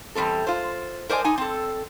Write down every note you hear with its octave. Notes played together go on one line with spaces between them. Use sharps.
E2 G2 G3 C4 A4
F4 C5
A#4 C5 D5 D#5 G#5
D#4 G#5
C4 A4